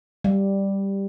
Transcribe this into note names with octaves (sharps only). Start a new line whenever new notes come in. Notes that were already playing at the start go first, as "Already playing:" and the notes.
G3